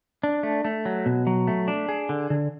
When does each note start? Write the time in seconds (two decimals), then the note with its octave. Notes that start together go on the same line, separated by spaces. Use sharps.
0.23 D4
0.43 A3
0.65 A3
0.86 F#3
1.06 B2
1.27 F#3
1.47 A3
1.68 D4
1.89 G#4
2.09 D3
2.30 D3